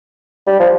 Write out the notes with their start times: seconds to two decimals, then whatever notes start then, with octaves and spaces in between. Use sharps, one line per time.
0.47 G3
0.60 F3